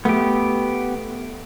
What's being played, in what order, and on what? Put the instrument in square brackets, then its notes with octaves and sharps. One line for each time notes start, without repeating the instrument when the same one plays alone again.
[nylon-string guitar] A3 [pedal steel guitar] B3 G4